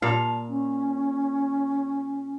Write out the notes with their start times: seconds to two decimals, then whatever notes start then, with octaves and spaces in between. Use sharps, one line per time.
0.02 A#2 F5 A5
0.49 C#4